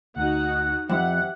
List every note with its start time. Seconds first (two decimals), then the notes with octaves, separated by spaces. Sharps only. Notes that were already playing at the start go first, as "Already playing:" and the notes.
0.16 D2 D#4 F#4 F#5
0.89 F2 G4 E5 F#5